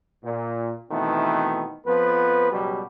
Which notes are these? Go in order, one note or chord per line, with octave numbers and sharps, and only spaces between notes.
A#2
B2 D#3 E3 A3 B3 C4
F2 F3 B3 B4
C#2 B2 F#3 G3